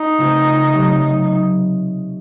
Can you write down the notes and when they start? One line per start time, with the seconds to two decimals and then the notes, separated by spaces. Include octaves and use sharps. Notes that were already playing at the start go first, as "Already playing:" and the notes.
Already playing: D#4
0.18 C#3 A3 C4 F4 C5
0.73 C3 F#3 A3 C4